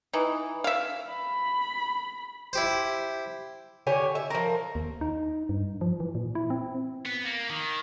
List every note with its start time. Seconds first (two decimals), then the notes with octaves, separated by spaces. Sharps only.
0.13 E3 D#4
0.64 E5 F5
1.09 B5
2.53 E4 G4 C5
3.87 D3 G4 C#5 G#5
4.15 E5
4.30 F3 A#4
4.75 D#2
5.01 D#4
5.49 G2
5.81 F3
6.00 E3
6.15 A#2
6.35 E4
6.50 C4
7.06 B3
7.25 A#3
7.50 D#3